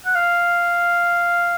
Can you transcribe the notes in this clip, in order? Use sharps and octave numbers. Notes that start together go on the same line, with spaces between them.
F#5
F5